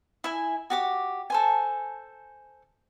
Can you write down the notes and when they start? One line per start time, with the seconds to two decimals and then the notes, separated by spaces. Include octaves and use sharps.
0.24 E4 E5 G#5
0.70 F#4 G4 D6
1.30 A4 C5 G#5